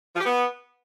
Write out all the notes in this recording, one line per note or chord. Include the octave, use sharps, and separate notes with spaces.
F3
G4
B3